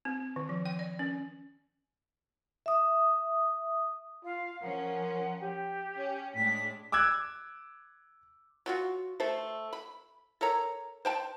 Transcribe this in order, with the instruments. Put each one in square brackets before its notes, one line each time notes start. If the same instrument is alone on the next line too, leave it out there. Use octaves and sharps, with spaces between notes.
[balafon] C4
D#3
F3
G5
D5
C#4
[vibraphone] E5 D#6
[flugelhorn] F4 [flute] F5
[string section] F3 C#4 [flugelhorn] A#4 [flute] F#5
[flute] G4 [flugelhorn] G5
[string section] C#4
[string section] A2 G#3 D4 [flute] B6
[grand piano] D6 E6 F#6 G#6
[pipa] F#3 F4 F#4
A3 A4 C5
B5
A4 A#4 C#5 A#5
C5 G5 A5